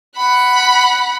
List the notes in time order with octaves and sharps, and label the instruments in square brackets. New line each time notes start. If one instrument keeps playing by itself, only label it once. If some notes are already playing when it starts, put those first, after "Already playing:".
[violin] F#5 B5